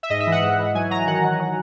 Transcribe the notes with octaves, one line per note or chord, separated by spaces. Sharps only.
E5
G#2 D#5
E5
E3
F#5
G#2
E3
F#3 G#5
F#3 A#5
D#3 F#5
D#3
F#3